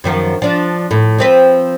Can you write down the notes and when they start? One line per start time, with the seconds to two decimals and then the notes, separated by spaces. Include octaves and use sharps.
0.04 F#2 D#3 F3
0.42 F3 D4
0.91 A2
1.18 F3 C4 B4